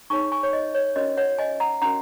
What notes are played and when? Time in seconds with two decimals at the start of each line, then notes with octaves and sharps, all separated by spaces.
0.10 D#4 G#4 C#5 G#5 C#6
0.32 G#5 C#6
0.43 C#5
0.53 D#5
0.75 C#5
0.96 C#4 F#4 A#4 C#5 D#5
1.17 C#5 F#5
1.39 D#5 G#5
1.60 F#5 A#5
1.82 C#4 F#4 A#4 F#5 A#5